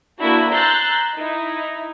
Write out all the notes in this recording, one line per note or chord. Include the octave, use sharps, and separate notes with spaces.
A#3 D4 E4 F#4
A#5 C6 E6 F#6 G6 A6
D#4 E4